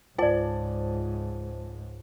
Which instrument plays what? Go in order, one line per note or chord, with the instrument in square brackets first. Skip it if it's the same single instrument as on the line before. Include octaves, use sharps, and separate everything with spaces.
[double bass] C#2 G#2 [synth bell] F4 C5 A5 [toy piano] D5 G#5